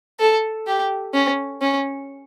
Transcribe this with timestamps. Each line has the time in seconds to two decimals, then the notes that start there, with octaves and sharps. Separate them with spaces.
0.20 A4
0.67 G4
1.14 C#4
1.62 C#4